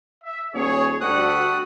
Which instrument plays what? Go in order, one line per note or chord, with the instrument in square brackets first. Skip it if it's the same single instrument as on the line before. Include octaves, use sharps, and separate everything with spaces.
[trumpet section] E5
[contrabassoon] D#1 [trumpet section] G#4 C#5
[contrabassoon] D2 [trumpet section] G3 A3 F#5 [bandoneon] F#4 D#6 F#6